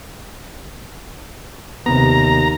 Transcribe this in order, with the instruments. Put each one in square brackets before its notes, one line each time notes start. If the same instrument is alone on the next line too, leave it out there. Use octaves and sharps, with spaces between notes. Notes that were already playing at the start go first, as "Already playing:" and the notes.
[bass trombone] D#2 [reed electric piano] C3 B3 [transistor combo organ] A#5